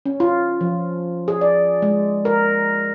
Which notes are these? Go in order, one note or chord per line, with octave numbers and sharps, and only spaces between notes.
C#4
F4
F3
G#4
D5
G#3
A#4